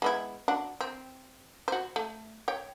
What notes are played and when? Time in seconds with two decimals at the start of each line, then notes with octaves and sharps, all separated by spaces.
0.02 G#3 B3 E4
0.48 D4 F#4
0.81 C4
1.68 F#4 C5
1.96 A3
2.48 C#5 G5